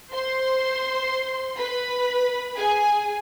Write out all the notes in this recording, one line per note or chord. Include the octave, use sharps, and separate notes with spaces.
C5 C6
B4 B5
G#4 G#5